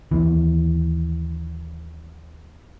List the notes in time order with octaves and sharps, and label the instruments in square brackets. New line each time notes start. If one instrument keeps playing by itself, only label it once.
[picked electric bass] D#2 E3